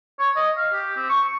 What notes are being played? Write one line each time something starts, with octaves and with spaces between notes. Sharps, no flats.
C#5
D#5
F5
G4
C4
C#6